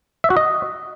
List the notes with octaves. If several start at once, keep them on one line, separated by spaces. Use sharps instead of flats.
E5
F#4
D#5